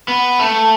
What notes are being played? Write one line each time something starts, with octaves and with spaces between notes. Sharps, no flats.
B3
A3